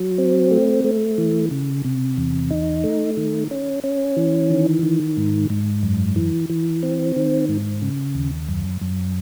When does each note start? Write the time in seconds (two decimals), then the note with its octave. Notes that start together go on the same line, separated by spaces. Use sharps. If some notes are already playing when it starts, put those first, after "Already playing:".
Already playing: F#3
0.18 C4
0.51 A3
0.84 A3
1.18 E3
1.51 C#3
1.84 C3
2.17 E2
2.50 D#4
2.84 A3
3.17 D#3
3.51 C#4
3.84 C#4
4.17 E3
4.50 D#3
4.83 D#3
5.17 G#2
5.50 G#2
5.83 F#2
6.16 E3
6.49 E3
6.83 C4
7.16 D#3
7.49 G#2
7.82 C#3
8.15 D#2
8.49 F#2
8.81 F#2